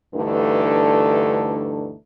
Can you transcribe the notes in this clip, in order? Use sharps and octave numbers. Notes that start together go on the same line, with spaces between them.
D2 G2 D3 E3 A3 D#4